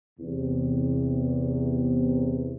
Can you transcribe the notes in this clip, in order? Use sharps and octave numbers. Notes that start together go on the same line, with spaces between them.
E2 C3